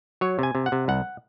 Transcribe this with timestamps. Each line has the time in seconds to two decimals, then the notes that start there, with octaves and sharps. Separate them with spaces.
0.21 F#3 C#5
0.39 C3 G#5
0.55 C3
0.66 F#5
0.72 C3
0.88 C2 F#5